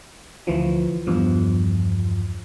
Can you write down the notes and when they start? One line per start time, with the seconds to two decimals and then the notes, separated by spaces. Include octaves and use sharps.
0.47 D2 E3 F3
1.07 E2 G2 F3